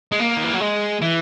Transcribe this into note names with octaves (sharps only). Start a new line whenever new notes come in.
G#3
A#3
D#3
E3
F#3
G#3
E3